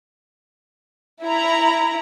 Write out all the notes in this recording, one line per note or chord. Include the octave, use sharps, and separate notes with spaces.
E4 A#5